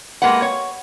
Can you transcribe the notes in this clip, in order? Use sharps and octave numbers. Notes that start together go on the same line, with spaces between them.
G#3 A#3 G4 B4 F#5
C#5